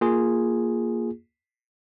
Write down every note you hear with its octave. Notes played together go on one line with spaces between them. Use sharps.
A#3 F4 G#4